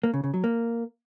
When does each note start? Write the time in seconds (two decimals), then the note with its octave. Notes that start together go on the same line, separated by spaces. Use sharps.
0.04 A#3
0.14 C#3
0.24 C#3
0.34 F#3
0.44 A#3